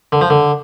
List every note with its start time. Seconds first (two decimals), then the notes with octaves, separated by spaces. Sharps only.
0.12 D3
0.21 F3
0.30 D3